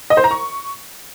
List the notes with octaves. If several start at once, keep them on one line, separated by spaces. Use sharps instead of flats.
D#5
C5
A#5
C#6